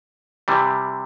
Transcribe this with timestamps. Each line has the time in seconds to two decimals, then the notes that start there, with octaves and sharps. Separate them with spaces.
0.48 C3 E3 G3